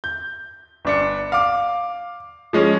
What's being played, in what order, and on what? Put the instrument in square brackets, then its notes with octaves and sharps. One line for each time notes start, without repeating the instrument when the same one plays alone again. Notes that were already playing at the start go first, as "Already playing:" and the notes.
[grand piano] G6
G1 D4 C#7
F5 D6
F3 G#3 C#4